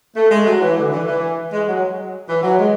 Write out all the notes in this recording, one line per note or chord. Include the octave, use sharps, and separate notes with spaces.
A3
G#3
F#3
E3
D3
E3
E3
G#3
F#3
E3
F#3
G#3